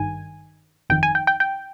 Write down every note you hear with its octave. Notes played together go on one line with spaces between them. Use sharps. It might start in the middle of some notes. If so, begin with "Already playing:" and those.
Already playing: G#1 G2 D#3 G#5
G1 F2 D#3 G5
G#5
G5
G5
G5